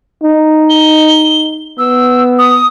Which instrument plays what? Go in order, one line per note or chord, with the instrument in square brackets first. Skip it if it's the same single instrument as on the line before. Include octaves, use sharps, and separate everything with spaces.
[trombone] D#4
[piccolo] G7
[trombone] B3 [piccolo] E6
[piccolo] D#6